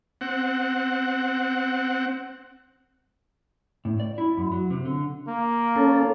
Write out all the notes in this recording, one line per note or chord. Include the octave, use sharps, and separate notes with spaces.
C4 F#5
A2
D5
E4
F#2
F#3
C3
D3
A#3
C#4 A4